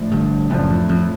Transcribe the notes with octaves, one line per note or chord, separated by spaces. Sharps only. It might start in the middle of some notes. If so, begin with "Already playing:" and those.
Already playing: A2 F3 A3 D4
G1 G2
F#1 F#2 A2 F3 A3 D4
F2
F2